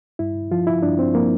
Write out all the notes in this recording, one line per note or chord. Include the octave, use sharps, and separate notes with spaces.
G2 E4
F3 F4
E4
G2 D4
C4
F3 A#3